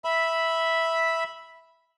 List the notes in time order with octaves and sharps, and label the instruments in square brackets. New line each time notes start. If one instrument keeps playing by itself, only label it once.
[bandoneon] E5 B5